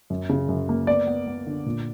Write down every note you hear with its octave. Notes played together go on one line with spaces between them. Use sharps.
F#2
C#3
F#2
A#3
B3 D5
B3
B3
D3
A#2